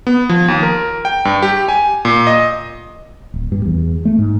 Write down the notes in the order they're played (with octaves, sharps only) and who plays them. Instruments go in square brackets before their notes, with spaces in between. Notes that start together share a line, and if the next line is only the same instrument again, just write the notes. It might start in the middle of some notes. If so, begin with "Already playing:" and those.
[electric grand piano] B3
F3
D#2
A#4
G5
G2
G4
G#5
A#2
D#5
[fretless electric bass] D1
G2
E2
A3
G#2